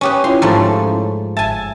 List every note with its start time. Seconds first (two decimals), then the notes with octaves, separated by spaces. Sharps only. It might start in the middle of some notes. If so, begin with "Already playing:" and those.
0.01 C#4 G4 B4 C#5 D#6
0.24 C#4 E4 F4 C6
0.42 G#2 F3 A3
1.37 G1 E5 G#5 A5